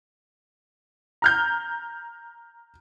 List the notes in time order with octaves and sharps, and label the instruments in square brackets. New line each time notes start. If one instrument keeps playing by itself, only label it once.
[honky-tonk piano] A#5 F6 G6